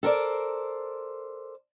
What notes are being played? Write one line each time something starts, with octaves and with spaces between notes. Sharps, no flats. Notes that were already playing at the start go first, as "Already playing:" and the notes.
A4 A#4 C5 D5